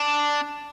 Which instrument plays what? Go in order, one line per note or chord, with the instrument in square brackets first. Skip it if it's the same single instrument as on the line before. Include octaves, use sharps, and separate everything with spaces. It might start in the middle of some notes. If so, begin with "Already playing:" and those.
Already playing: [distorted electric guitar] D4